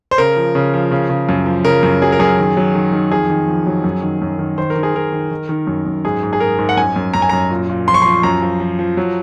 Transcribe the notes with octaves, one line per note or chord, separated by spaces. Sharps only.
C5
C#3 A#4
F3
C#3
F3
C#3
C#3
F#2
F3
C#3 A#4
F#2
F#3 G#4
A#4
F#2 G#4
D#3
F#3
D#3
D#3
F2 G#4
D#3
F2
F#3
F#2
D#3
F#2
D#3
D#3 C5
A#4
D#3
G#4
D#3 A#4
D#3
D#3
D#3
F#2
F#2
G#2 G#4
G#2
G#4
G#2 A#4
G#2
F#5
F#2 G#5
F#2
F#2 A#5
G#5
F#2 A#5
A#2
A#2
F3 C6
C#6
F3 C6
F#2 A#5
F3
F3
F3
F#3